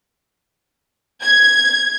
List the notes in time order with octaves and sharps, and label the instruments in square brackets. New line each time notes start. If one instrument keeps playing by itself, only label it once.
[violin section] G#6